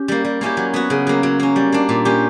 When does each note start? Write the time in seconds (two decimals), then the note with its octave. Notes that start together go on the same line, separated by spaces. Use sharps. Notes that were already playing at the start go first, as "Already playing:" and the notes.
Already playing: C#4 G4
0.08 G3 A#3
0.25 G3
0.41 A#3 C#4 E4 G4
0.57 F#3
0.74 B3 F#4
0.90 C#3
1.07 F#3 A#3
1.23 F#3
1.40 A#3 C#4
1.56 G3
1.72 A#3 D4
1.89 A#2
2.05 A#3 C#4 G4